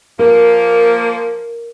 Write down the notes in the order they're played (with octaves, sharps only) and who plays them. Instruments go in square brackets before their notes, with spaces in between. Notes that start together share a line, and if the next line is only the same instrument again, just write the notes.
[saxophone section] F3 A#3 [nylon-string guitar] A#4